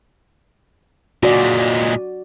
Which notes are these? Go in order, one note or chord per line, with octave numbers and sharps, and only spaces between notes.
A#2 G#3 F#4 D5